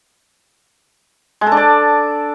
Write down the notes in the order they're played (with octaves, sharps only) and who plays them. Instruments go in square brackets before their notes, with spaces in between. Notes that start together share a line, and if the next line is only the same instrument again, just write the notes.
[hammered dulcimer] G#3
A4
D4
D5